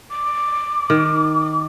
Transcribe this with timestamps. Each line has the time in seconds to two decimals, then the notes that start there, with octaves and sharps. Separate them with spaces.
0.11 D6
0.90 D#3